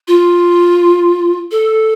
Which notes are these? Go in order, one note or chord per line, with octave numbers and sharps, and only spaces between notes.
F4
A4